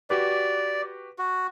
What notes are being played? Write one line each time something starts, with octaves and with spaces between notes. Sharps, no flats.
F#4 G4 B4 D5
F#4